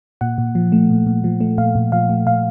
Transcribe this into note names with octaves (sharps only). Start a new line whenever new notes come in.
A#2 F#5
A#2
F3
A3
A#2
A#2
F3
A3
A#2 F5
A#2
F3 F5
A3
A#2 F5